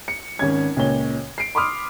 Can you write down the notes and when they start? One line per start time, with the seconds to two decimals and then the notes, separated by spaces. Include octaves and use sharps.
0.08 C#7
0.39 G#1 C#4 G#6
0.77 C#2 A#2 C#5 G7
1.38 C7 D7
1.55 B5 C6 D6 D#6 F6